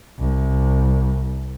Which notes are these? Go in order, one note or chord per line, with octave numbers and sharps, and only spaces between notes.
C2